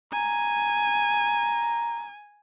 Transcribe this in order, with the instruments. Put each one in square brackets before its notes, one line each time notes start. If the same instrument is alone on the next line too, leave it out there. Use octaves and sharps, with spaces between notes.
[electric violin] G#5 [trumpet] A#5